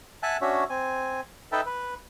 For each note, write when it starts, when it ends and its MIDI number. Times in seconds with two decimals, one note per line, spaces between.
0.23 0.37 76
0.23 0.37 78
0.23 0.37 80
0.23 0.37 81
0.23 0.37 90
0.41 0.64 61
0.41 0.64 62
0.41 0.64 66
0.41 0.64 73
0.41 0.64 76
0.70 1.21 60
0.70 1.21 80
1.52 1.61 63
1.52 1.61 69
1.52 1.61 71
1.52 1.61 76
1.52 1.61 79
1.52 1.61 81
1.66 1.94 71